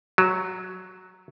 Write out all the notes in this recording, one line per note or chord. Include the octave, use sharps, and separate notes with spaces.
F#3